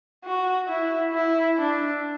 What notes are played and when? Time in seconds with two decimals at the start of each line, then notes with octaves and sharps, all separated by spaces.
0.24 F#4
0.68 E4
1.13 E4
1.59 D4